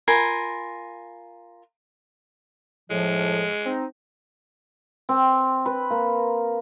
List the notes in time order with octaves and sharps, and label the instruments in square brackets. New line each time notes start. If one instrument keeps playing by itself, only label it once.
[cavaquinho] F4 A#4 G#5 B5
[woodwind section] A2 F3 [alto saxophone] G#3
[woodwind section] C4 D#4
[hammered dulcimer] C4
B4
A#3